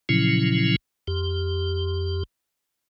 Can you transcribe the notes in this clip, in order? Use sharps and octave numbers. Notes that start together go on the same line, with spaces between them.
A#2 C#3 F3 F#3 C#4 E4
F2 G4